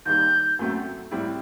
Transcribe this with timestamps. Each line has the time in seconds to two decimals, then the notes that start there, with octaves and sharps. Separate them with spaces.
0.05 D#2 D#3 G3 G6
0.59 F#2 F#3 A3 C4
1.11 A2 G3 C4 E4